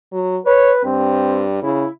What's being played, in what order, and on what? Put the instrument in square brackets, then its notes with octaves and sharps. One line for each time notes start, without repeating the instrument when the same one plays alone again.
[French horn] F#3
[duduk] B4 [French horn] C#5
[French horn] G2 [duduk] C4
[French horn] C#3 [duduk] E4